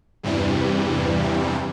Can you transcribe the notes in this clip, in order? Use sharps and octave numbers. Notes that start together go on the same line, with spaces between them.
E2 G2 C3 E3 G3